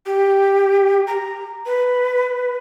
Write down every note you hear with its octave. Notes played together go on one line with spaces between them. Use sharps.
G4
A#5
B4